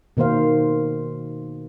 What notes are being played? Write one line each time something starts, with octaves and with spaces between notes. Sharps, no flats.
B2 D#3 A#3 C5 F5